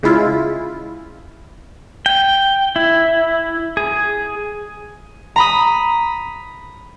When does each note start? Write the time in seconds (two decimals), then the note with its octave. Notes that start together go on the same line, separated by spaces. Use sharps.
0.03 C#3 G#3 E4 F4
2.06 G5
2.76 E4
3.77 G#4
5.36 A#5 B5 D#6